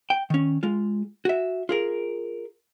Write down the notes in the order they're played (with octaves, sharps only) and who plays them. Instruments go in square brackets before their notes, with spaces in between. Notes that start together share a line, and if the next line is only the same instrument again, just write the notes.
[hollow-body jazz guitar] G5
D#3 C#4
G#3 F4
F#4 E5
F4 G#4 A#4